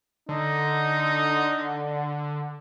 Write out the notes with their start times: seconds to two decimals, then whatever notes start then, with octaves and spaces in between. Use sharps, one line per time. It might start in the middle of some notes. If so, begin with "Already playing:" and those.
0.29 D3 D#4